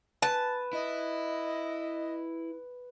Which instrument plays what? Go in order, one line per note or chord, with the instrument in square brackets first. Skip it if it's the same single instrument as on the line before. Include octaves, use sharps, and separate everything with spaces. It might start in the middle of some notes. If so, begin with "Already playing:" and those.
[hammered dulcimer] B4 [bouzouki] A5
[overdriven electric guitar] E4 [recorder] D#5